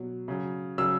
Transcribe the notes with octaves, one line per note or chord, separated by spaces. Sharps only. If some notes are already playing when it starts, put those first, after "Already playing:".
Already playing: B2 F#3
C#3 F#3
C#3 F#3 E6